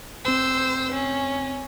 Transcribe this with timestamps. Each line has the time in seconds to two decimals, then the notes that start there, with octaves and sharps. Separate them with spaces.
0.25 F1 C4 C5 E6
0.92 C#4